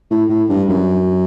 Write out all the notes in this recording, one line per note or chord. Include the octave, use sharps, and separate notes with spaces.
A2
A2
G2
F#2